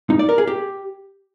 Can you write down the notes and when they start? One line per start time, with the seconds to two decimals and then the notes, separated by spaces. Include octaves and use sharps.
0.10 D#4
0.19 D5
0.29 A#4
0.38 G#4
0.47 G4